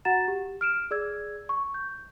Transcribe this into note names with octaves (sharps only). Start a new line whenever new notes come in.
F#4 F#5 A#5 A6 E7
G4
F6 D7 E7
G#4 D5 E6 G#6
C#6
G6